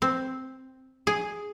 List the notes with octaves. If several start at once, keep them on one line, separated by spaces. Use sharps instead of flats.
C4
G#4